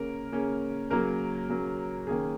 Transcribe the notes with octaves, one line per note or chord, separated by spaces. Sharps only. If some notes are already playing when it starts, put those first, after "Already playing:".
Already playing: C#3 A#3 C#4 A#4
C#3 A#3 C#4
C#3 F#3 A#3 C#4 A#4
C#3 F#3 A#3 C#4
D#3 A#3 C#4 G#4